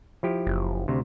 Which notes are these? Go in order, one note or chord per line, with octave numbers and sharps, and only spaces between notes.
F3 E4 G4
F#1
D2 C3